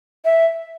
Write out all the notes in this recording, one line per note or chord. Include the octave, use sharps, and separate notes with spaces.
E5